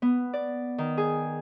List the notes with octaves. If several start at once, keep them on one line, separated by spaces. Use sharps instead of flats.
B3
D5
D#3
G#4